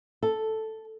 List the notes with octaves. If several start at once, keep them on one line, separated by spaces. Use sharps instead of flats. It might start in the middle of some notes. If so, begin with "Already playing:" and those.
A4